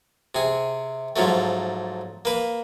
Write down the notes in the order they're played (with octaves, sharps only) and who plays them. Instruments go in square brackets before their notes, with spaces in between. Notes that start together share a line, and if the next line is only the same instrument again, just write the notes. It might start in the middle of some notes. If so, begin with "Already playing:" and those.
[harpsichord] C3 G#4
G#2 F3 F#3 A3
A#3 B4